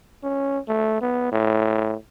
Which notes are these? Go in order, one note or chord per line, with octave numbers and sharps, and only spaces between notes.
C#4
A3
B3
A2